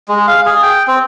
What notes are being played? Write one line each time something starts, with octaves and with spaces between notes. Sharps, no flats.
G#3
F5
G#4
G5
C4